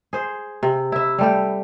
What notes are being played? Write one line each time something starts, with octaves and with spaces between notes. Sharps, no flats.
G#4 C5
C3
E4 E5
G3 A3 G4